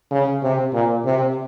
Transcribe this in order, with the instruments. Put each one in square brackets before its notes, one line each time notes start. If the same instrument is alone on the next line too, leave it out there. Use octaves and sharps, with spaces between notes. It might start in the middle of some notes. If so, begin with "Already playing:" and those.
[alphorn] C#3
C3
A#2
C3